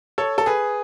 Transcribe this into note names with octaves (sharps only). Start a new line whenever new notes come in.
A4 C#5
A4
G#4 B4